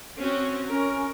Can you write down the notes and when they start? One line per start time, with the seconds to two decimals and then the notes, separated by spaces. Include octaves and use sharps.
0.19 C4 C#4 F#4
0.70 C#4 A#4